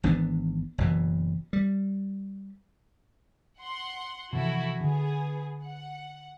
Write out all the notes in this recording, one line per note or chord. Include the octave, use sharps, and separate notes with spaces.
G#1 E3 B3 D4
F#1 B2 E3
G3
F#5 C6
C3 E3 F3 E4 F#4 A4
D3 B3 G#4
F#5